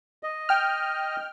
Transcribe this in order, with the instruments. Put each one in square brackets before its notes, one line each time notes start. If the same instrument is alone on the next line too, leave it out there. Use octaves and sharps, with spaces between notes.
[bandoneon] D#5
[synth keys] G5 F6